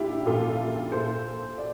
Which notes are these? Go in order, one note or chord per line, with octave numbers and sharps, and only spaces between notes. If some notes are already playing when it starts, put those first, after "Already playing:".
Already playing: A#2 D4 E4 F4 G4
A#2 F4 A4
A#2 A4 C5
D5